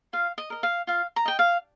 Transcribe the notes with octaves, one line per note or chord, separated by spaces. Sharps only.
F4 F5
D#5
A#4 D#5
F5
F4 F5
A#5
D#5 G5
F5